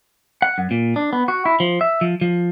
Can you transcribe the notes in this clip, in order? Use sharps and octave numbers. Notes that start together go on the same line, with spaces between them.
F#5
F#2
A#2
D4
B3
F#4
E4
F3
E5
F3
F3